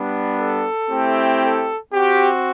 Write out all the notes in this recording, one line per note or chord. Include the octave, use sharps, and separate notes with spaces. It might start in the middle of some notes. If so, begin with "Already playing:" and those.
Already playing: G3 B3 D4
A4
A3 C4 E4 G4
A4
C4 F#4 G4